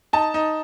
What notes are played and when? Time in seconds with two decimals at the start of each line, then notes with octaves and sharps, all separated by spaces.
0.13 D#4 A5
0.34 D#4